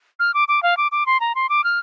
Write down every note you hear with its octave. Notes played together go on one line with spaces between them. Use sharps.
F6
D6
D6
F5
D6
D6
C6
A#5
C6
D6
F6